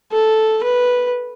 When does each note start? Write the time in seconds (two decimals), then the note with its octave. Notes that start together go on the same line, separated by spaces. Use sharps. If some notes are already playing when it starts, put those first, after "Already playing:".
0.12 A4
0.63 B4